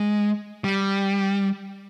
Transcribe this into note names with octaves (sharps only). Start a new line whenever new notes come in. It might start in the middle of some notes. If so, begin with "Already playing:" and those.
Already playing: G#3
G3